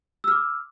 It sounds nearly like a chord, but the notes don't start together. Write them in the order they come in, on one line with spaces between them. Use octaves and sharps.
E6 F6 D6